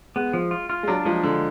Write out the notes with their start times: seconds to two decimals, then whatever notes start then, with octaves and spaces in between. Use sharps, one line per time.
0.16 G#3 B3
0.33 F3
0.51 F4
0.70 F4
0.83 G#3
0.88 F#3 D4
1.05 F3 G#3
1.23 D3 G#3